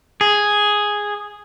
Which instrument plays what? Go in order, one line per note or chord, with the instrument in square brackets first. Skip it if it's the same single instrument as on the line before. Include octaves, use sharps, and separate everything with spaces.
[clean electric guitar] G#4